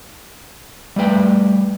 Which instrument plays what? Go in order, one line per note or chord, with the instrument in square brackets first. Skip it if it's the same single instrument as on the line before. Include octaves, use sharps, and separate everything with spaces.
[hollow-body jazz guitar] G3 A3 B4 G5